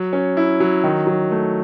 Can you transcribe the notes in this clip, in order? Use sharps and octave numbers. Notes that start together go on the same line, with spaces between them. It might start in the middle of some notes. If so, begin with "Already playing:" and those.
Already playing: F#3
C#4
E4
F#3
D#3
F#3
A3